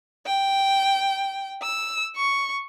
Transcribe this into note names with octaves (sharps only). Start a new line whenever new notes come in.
G5
E6
C#6